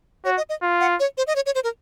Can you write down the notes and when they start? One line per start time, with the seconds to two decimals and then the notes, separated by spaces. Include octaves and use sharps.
0.25 F#4 C#5
0.37 D#5
0.49 D#5
0.62 F4
0.80 F#5
0.99 C#5
1.17 C5
1.27 D#5
1.35 C#5
1.46 C#5
1.55 C5
1.64 A#4